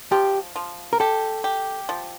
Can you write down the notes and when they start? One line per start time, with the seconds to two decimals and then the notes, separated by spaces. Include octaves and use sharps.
0.12 F3 G4
0.56 F3
0.93 A#4
1.00 G4 A4
1.44 G4
1.89 F3